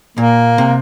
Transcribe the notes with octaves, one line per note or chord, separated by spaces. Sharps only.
A#2 A#3
C3